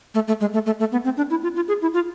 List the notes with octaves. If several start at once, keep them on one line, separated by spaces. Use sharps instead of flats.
A3
A3
G#3
A3
A3
A3
B3
C4
D4
E4
F4
F4
G#4
E4
F4